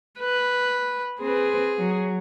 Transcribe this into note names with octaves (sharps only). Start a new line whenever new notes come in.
B4
C4 G#4 B4
F#3